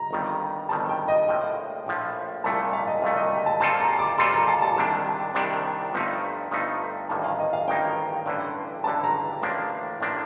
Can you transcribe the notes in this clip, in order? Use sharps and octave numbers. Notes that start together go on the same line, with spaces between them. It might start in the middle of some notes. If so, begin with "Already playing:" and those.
Already playing: A#5
G1 F2 D#3 G3
G1 F2 D#3 G3 A5
G5
D#5
A#1 A2 F3 G5
A#1 A2 F3
C2 A#2 A3 A5
F5
D#5
C2 A#2 A3 F5
D#5
G5
A5
A#2 G3 C4 F4 A4 A5
A#5
D6
A#2 G3 C4 F4 A4 C6
A#5
A5
A5
C2 C3 D#3 G3 D4 A5
C2 C3 D#3 G3 D4
G1 G2 F3 A3 D#4
G1 G2 F3 A3 D#4
A1 G2 D#3 A#3 D#4 A5
F5
D#5
F5
A1 G2 D#3 A#3 D#4 G5
A1 G2 D3
A1 G2 D3 A5
A#5
A1 A2 F3 A#3 D4
A1 A2 F3 A#3 D4